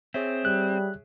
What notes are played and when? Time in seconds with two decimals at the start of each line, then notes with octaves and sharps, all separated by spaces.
0.14 C4 G#4 C#5 E5
0.45 G3 F#6